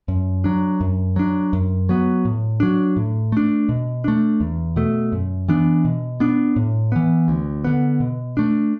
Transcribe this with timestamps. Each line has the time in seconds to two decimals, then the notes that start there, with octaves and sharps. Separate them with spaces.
0.08 F#2
0.44 F#3 D4
0.81 F#2
1.16 F#3 D4
1.53 F#2
1.89 F#3 B3
2.25 A2
2.60 F#3 D4
2.97 A2
3.32 A3 D4
3.69 B2
4.04 A3 D4
4.40 E2
4.76 B2 A3
5.12 F#2
5.48 E3 B3 D4
5.85 B2
6.20 B3 D4
6.56 A2
6.92 E3 B3
7.28 D2
7.64 D3 B3
8.00 B2
8.37 A3 D4